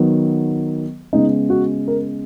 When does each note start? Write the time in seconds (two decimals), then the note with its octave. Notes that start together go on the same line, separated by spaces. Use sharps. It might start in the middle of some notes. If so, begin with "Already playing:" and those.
Already playing: D#3 F#3 B3
1.13 C#3 G#3 B3 D#4
1.50 F#4
1.88 A#4